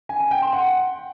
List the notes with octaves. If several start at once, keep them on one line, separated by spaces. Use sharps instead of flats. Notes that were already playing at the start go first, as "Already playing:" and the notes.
G#5
G#5
G5
C6
F#5